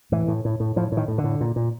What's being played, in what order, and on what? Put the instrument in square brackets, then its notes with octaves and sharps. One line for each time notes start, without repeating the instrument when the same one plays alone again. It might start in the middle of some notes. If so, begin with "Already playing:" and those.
[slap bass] A2 E3
A2
A2
A2
A2 F3
A2
D#3
A2
D3
A2
A#2
A#2